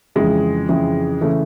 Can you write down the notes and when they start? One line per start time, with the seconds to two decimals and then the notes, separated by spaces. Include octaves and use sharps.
0.16 F2 C#3 E3 G#3
0.69 F2 C#3 E3
1.21 C#3 E3 A3